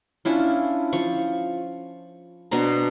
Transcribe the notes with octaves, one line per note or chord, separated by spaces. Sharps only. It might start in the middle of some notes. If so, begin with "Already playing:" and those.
C#4 D4 E4 F4
F3 C#6
B2 D4 C5 A#5